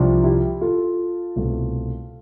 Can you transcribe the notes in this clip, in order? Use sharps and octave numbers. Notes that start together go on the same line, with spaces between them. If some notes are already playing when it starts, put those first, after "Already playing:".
Already playing: C2 C3 F3 D4 F4
E4 G4
F4 A4
C2 B2 A3